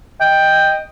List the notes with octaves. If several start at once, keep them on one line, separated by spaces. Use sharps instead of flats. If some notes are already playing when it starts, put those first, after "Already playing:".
D#5 G5